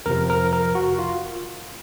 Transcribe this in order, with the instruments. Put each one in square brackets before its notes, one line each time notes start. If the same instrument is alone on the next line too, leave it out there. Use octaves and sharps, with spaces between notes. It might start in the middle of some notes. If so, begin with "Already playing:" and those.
[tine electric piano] F2 C3 F3 A#4
A#4
A#4
F#4
F4